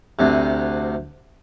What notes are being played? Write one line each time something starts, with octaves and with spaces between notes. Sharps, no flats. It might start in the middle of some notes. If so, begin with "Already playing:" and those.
D2 C3